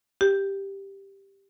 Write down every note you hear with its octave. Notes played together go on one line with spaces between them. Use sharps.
G4